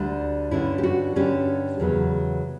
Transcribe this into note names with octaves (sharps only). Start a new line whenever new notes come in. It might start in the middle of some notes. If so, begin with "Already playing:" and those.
Already playing: D2 D3 G3
G2 D3 G3 C#4 E4
G4
F#4
G2 D3 G3 C#4 G4
E2 C#3 F#3 B3